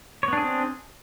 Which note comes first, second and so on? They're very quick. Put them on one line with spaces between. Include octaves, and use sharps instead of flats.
C#5 B3 D4 G#4 C4